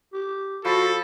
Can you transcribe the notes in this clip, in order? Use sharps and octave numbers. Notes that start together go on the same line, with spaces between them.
G4
F3 F#4 A4 B5